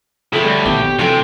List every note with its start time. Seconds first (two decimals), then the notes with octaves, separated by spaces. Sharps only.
0.33 C3 G#4 A4 B4 C#5 E5
0.45 D2 G3
0.66 A#1 B2 D#3 G4 C#5
0.86 B2
0.99 D2 C3 E3 F#3 A4 G5 G#5 A#5